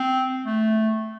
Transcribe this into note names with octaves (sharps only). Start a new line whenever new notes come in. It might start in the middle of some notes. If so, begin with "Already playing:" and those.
Already playing: C4
A3